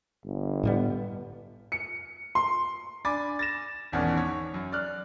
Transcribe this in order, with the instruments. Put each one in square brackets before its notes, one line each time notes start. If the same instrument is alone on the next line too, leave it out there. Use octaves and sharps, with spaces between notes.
[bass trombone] G1
[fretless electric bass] A2 G3 B3
[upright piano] C#7
C6
[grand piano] D4 G#5 B5 D6 A6
A6 A#6 E7
G#1 E2 B2 D#3 C#4 D5
C#5
F#2
D5 F6 F#6